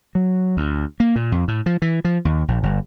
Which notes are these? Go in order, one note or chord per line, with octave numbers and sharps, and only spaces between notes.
F#3
D2
A#3
A#2
F2
A2
F3
E3
F3
D#2
A#1
G1